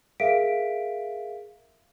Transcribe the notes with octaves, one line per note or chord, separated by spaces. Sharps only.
G#4 A#4 E5 F5 B6 D7